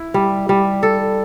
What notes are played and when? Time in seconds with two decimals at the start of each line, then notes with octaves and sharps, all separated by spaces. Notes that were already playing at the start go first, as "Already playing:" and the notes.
Already playing: E4
0.14 G3
0.49 G3
0.83 A4